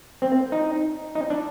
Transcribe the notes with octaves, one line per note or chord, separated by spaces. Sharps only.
C4
D#4
D#4
D4